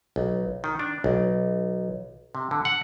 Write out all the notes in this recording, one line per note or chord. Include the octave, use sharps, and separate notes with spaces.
B1
D#3
D4
B1
C3
D3
F#5